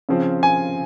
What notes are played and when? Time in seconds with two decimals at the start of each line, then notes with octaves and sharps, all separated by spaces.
0.09 C#3 F3 C4 F4
0.43 G#5